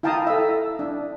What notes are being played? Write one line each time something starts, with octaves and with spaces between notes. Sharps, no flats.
E4 F5 G5 A5 A#5 D#6
A4 E5
D4